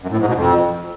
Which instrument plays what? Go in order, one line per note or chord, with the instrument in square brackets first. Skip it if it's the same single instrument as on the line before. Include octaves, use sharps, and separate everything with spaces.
[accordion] F#2
A2
G#2
B2
F2